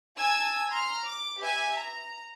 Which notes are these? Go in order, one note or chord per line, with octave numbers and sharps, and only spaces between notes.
G#5 A5 E6 G#6
A#5 C6 F6
D6
G4 B4 E5 G#5
A#5